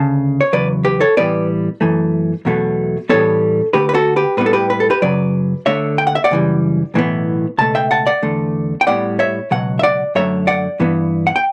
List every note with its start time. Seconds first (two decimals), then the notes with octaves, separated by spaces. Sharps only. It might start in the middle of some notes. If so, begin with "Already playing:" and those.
Already playing: D2 C#3 A5
0.41 C#5
0.53 E2 C#3 F#3 B4 D5
0.85 G4 B4
1.00 A4 C#5
1.17 A2 E3 G3 B3 B4 D5
1.81 F#2 E3 A3
2.45 E2 B2 F#3 A3
3.09 A2 E3 G3 B3 A4 C#5
3.73 D2 D3 A3 G4 B4
3.89 B4
3.94 F#4 A4
4.16 G4 B4
4.37 A2 G3 B3 B4
4.46 A4
4.53 G4 B4
4.70 B4
4.80 A4
4.90 G4 B4
5.02 F#2 C#3 F#3 B4 D5
5.66 D2 D3 A3 C#5 E5
5.98 G5
6.07 F#5
6.15 E5
6.24 D5 F#5
6.31 F#2 C#3 E3 G3
6.94 B1 A2 E3 G3 B3
7.58 C#2 B2 A3 A5
7.75 E5 G5
7.91 F#5 A5
8.07 D5 F#5
8.23 E2 D3 A3
8.81 G5
8.87 A2 G3 B3 D5 F#5
9.19 C#5 E5
9.51 C#2 B2 F#3 F#5
9.79 E5
9.83 D5 F#5
10.15 F#2 D3 F#3 A3 C#5 E5
10.47 D5 F#5
10.80 G2 E3 B3
11.27 F#5
11.36 G5